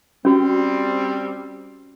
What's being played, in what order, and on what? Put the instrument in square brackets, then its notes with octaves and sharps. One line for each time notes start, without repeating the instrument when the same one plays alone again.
[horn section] G3 C4 [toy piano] C#4 F#4